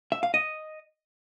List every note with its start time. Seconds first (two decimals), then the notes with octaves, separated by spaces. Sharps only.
0.12 E5
0.23 F5
0.34 D#5